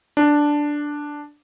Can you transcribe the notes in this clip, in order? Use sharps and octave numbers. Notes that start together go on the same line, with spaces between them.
D4